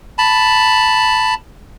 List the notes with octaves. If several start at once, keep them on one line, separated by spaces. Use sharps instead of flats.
A5 B5